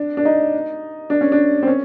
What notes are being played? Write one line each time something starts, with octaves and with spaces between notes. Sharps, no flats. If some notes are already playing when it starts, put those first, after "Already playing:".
Already playing: D4
D4
D#4
D4
C#4
D4
C4
C#4